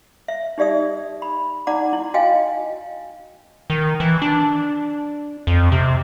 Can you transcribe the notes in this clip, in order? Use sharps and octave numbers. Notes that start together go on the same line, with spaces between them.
E5
D#4 G4 D5 E5 D#6
B5
D#4 D5 F#5 A#5 D6
E4
F#4 D#5 F5 G5 G#5
D#3
E3
D4
F2
C3